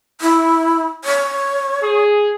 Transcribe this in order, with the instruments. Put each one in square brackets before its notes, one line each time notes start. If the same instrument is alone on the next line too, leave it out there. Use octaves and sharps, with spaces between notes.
[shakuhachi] E4
C#5
[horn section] G#4